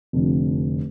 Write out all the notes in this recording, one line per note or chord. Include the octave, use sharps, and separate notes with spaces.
F1 F2 D3